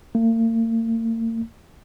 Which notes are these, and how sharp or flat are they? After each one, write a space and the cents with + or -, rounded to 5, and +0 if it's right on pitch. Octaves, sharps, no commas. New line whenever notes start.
A#3 -45